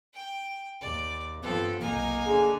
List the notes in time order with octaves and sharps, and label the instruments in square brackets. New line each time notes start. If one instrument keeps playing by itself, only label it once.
[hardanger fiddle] G5
[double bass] D#2 [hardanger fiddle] D5
[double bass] G2 F3 [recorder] B3 [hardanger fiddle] C4 A4
[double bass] F1 B1 [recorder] A#3 [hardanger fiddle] D#4 G#5
[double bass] D3 D4 [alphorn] G#4